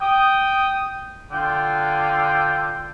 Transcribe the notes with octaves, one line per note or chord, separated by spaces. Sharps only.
G5 D#6
D3 F4 G5